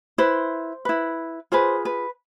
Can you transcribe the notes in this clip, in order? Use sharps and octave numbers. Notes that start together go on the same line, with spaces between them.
E4 B4 C5
E4 B4
F4 G#4 B4 C5
B4